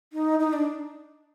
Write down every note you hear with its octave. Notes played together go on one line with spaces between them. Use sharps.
D#4
D#4
D4